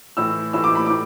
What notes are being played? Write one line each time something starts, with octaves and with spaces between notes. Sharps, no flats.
A2 E3 E6
A2 E3 E6
D6
B5
A2 D6